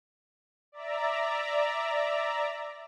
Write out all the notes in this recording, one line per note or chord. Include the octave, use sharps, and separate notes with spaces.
D5 E5 A#5